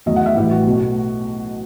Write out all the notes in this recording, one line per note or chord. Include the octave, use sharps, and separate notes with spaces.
E2 D#3 F#3 A3 D#5
F#5
E5
A1 A2 E3 G3 G4
F#4
B1 B2 A3